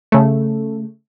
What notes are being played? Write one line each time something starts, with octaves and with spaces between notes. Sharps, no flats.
C#3 A3